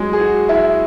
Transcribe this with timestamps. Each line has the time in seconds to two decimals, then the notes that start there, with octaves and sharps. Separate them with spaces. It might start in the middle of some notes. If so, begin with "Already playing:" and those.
Already playing: F#3 G#3
0.13 G#4
0.20 F#4
0.49 E4